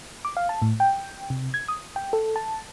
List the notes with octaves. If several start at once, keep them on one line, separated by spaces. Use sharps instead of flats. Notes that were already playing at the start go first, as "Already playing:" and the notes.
D6
F5
A5
A2
G5
C3
G#6
D#6
G5
A4
A5